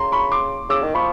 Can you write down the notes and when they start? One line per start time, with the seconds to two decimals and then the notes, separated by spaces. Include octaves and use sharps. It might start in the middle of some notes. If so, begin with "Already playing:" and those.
Already playing: C#3 A#5 C6
0.12 B5 C#6
0.32 C6 D6
0.69 C#3 D6 E6
0.82 D#3
0.95 F3 B5 C#6